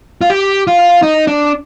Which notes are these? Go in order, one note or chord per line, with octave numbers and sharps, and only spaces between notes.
F4
G4
F4
D#4
D4